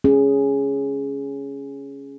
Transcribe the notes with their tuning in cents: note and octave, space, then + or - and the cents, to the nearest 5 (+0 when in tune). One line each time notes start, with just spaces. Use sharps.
C#4 +0 G#4 +0